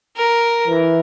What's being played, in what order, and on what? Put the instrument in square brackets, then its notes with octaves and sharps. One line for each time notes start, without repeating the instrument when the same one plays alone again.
[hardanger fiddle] A#4
[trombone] E3